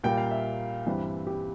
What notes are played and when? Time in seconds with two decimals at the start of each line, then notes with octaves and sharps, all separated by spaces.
0.04 A#2 G3 A#3 G5
0.17 F5
0.31 E5
0.86 G2 E3 G3 C4
1.27 G4